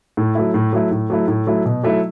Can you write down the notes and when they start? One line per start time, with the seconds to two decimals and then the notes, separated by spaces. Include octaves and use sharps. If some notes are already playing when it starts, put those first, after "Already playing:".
0.17 A2
0.35 F#3 A3 E4
0.54 A2
0.73 F#3 A3 E4
0.91 A2
1.10 F#3 A3 E4
1.28 A2
1.47 F#3 A3 E4
1.65 B2
1.83 F#3 A3 E4